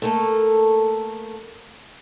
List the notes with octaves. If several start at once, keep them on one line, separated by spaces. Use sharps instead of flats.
A3 A#3 A4